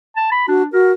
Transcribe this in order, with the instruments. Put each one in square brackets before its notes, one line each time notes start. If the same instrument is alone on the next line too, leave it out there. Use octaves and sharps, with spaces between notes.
[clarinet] A5
B5
[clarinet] D4 [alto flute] F#4
[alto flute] F#4 [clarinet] A#4